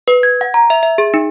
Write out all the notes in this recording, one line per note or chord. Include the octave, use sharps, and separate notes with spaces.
B4
G#6
F#5
A#5
E5
E5
G#4
D#4